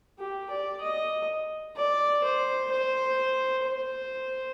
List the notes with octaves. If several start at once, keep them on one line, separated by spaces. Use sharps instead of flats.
G4
D5
D#5
D5
C5
C5
C5